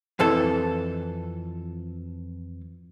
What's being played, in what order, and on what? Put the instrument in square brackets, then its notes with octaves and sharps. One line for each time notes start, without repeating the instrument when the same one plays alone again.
[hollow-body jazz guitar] F2 E3 A4